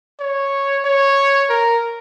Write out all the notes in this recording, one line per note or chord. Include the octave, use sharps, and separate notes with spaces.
C#5
C#5
A#4